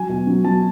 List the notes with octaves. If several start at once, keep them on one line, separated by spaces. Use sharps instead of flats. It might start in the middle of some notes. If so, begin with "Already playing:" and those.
Already playing: F#3 G#5
B2
F#3
F#3 A5